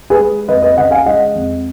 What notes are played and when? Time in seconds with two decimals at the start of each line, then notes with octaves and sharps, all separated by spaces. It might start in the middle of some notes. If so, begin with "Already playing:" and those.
0.10 G#4 B4
0.20 G#3
0.48 F2 B4 D#5
0.63 B4 D#5
0.77 C#3 D#5 F#5
0.91 F5 G#5
1.06 G#3 D#5 F#5
1.35 F2